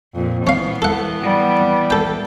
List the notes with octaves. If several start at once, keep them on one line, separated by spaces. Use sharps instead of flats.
F2 A#2
E3 B3 C#4 F5
A4 F#5
G3
A4 G5